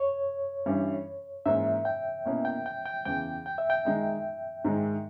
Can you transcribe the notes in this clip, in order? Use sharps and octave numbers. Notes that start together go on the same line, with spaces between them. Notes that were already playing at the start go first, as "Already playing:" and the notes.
Already playing: C#5
G2 E3 G3 C#4
G#2 E3 A#3 C#4 E5
G5
B2 A#3 C#4 E4
G5
G5
G5
E2 C#3 E3 G5
G5
E5
G5
D#3 G#3 D#4
G#2 D#3 G#3